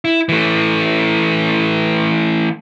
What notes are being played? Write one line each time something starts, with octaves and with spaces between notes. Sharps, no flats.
E4
E3 A3